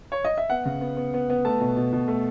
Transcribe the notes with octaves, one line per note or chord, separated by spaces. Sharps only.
C#5
D#5
E5
B3 F#5
C#3
B3
B3
B3
B3
A3 A5
B2
B2
B2
A3